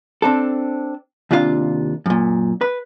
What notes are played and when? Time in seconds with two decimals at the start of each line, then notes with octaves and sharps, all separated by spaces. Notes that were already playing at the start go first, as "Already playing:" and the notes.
0.22 C4 D4 A4
1.31 D#2 C3 D4 F4 G4 F5
2.06 F#2 A#2
2.61 B4